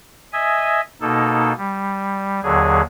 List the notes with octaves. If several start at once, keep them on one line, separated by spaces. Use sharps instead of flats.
D#5 E5 G#5
B2 A#3 D#4 A4
G3
D#2 D3 F#3 G#4